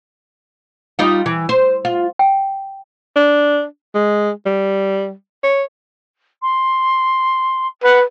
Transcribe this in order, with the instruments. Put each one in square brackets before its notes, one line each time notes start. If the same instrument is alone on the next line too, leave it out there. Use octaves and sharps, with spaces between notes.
[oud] G3 D#4 F4
E3
C5
F4
[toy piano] G5
[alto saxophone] D4
G#3
G3
C#5
[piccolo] C6
[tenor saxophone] B4 [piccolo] F#5